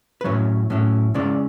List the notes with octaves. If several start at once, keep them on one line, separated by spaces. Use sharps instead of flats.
B4
A2 F#3 C#4 E4 C#5
A2 F#3 C#4 E4
C#3 G#3 C#4 E4 D5